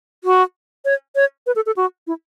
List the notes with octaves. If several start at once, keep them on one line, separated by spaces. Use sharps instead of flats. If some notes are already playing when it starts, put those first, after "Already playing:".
F#4
C#5
C#5
B4
A4
A4
F#4
E4